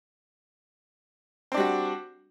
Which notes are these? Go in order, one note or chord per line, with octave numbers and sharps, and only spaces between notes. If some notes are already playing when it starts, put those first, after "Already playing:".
G3 C4 D4 F#4